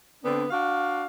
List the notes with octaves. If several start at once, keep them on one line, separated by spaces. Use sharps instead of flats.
D3 B3 C4 D4
D4 F#4 F5